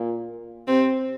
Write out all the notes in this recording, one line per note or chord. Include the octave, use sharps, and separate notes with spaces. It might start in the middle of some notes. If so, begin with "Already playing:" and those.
Already playing: A#2
C3 C4